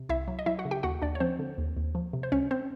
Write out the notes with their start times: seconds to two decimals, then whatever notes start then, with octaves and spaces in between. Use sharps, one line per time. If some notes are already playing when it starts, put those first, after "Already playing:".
Already playing: C3
0.09 C2 E4 E5
0.28 F#3
0.39 D#5
0.46 F#3 E4 E5
0.59 F#4 F#5
0.65 C#3
0.71 G4 G5
0.83 D#2 F#4 F#5
1.02 D#2 D4 D5
1.15 C#5
1.20 F3 C4 C5
1.39 D3
1.58 D#2
1.77 D#2
1.95 F3
2.13 C3
2.23 C5
2.32 C#2 C#4 C#5
2.51 C4 C5